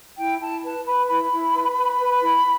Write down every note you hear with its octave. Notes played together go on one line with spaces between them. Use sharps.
E4 G5
E4 A5
B4 A5
B4 B5
E4 B5
E4
B4
B4
B4
E4